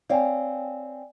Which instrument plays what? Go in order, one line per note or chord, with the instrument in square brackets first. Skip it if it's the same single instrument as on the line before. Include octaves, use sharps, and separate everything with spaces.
[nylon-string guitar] C4 C#5 F5 [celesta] D5 G5 G#5